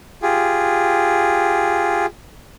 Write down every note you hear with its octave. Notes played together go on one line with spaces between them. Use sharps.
F4 G4 G#4